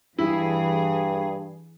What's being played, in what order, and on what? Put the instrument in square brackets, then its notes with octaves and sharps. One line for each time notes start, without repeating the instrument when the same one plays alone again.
[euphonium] G2 [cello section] E3 G#4 [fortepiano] E4